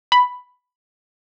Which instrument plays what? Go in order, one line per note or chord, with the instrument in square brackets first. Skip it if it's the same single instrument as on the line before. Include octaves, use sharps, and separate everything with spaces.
[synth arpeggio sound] B5